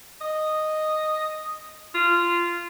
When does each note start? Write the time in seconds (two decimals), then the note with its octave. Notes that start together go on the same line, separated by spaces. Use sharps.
0.21 D#5
1.94 F4